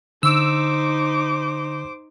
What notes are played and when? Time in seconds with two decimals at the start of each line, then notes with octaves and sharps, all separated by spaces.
0.23 D3 D#4 C5 D6 E6